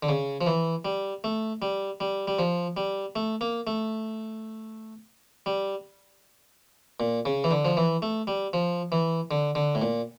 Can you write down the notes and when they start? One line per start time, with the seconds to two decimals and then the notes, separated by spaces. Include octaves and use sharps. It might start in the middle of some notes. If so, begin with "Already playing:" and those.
0.03 D3
0.09 C#3
0.41 F3
0.47 E3
0.85 G3
1.24 A3
1.62 G3
2.00 G3
2.28 G3
2.39 F3
2.77 G3
3.16 A3
3.41 A#3
3.67 A3
5.46 G3
7.00 A#2
7.25 C#3
7.44 E3
7.51 D3
7.65 F3
7.77 E3
8.02 A3
8.27 G3
8.53 F3
8.92 E3
9.31 D3
9.55 D3
9.75 A2
9.82 A#2